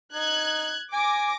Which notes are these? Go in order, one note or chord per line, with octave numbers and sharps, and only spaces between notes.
D#4 F#6 G#6
G#5 D6 A#6